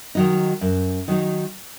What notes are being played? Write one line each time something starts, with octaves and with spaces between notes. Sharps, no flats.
D#3 F#3 D#4
F#2
D#3 F#3 D#4